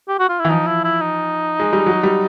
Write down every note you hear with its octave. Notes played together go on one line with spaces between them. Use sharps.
G4
F#4
F4
E3 E4
F3 D#4
E4
E4
D#4
G#3
G3
F#3
G3